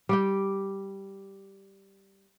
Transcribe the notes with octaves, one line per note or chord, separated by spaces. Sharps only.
G3 G4 G5